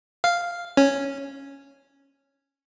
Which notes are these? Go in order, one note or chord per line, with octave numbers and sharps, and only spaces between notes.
F5
C#4